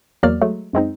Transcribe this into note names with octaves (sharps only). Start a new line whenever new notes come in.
E2 F#3 A#3 D5 F6
F#3 G#3 A3
F#2 G#3 C4 D#4